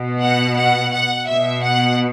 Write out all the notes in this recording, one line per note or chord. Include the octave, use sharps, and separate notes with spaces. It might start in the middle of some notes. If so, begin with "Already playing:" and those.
Already playing: B2
F#5
F#5
F#5
B2 E5
F#5